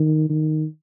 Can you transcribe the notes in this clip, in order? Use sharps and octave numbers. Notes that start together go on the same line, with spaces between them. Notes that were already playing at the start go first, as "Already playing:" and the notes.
Already playing: D#3
D#3